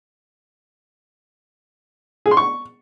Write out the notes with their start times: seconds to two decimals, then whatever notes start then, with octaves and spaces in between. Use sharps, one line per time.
2.26 G#4
2.31 C6
2.37 C#6